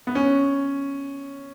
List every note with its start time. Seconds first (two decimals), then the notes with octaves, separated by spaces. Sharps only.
0.07 B3
0.15 C#4